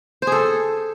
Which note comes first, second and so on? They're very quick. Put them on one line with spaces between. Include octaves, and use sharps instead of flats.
C5 G#4 A4